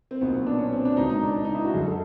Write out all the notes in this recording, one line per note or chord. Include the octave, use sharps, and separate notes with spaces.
C4
B1 A#2 B3
B3
D4
C#4
C4
D4
C#2 B2 D#4
D#4
D4
D#4
E4
F#4
F#1 F#2 D3 G#4
A4